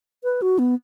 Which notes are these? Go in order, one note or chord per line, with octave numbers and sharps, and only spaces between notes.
B4
F#4
B3